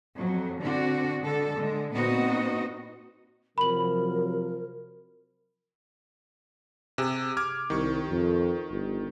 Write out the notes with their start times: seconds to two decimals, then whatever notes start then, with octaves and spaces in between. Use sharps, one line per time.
0.16 F2 F#3
0.59 D3 C4 D4 F#4
1.22 D3 G#3 A4
1.57 D3 G#3
1.94 A#2 B3 C4 D#4 F#4 D#5
3.58 C3 F3 F#3 A#4 B5 F#7
6.98 C3 G#4
7.37 D6 F6 G#6
7.70 C2 D#3 C#6
8.10 F2
8.71 G1